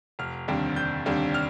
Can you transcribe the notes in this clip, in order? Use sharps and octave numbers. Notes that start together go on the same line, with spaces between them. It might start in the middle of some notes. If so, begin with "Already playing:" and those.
F1 F6
D#2 D3 G3 C4
F1 G6
D#2 D3 G3 C4
F6